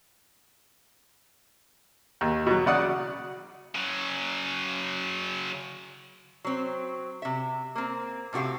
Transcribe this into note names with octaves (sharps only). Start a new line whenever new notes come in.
D#2
B2 F#3
C#3 D5 F#5 D#6
C#3 F#3
F#3 C4
C3 E5
A#3 C4
A2 C3 F#4 G4 F5